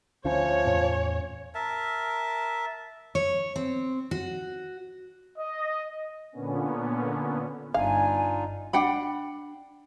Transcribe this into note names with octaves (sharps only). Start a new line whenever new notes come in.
D2 F3 C#4 C#5
E2 A2 C#4
A#4 E5 A5
C#5
C4
F#4
D#5
A#2 D3 B3 C#4
G1 D4 D#4 F4 F5 G#5
D4 F#5 G5 B5